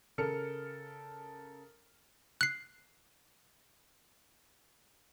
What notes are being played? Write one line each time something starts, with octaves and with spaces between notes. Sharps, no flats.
C#3 A4 A#4 F6 C#7
F#6 C7